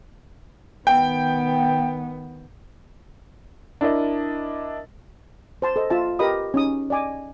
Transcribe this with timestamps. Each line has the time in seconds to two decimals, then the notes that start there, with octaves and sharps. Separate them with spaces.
0.87 D#3 B3 G5
3.81 D4 E4 A#4 D#5
5.62 C5 A5 C6
5.76 A4 C5 D#5
5.90 F4 E5 A5
6.19 G4 A#4 B4 D#5 B5 D#6
6.54 C#4 D#4 D#6
6.90 D5 D#5 G#5 D6